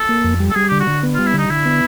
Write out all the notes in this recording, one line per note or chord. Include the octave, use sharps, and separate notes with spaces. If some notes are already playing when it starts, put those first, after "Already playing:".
Already playing: A4
A#3
F2
G3
A4
G3 G#4
D3 G4
F#4
D3
B3
G3 F4
E4
D3 D#4
D3 E4
B3